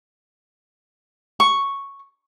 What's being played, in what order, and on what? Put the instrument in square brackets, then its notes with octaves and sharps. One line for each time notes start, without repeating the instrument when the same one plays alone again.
[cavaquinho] C#6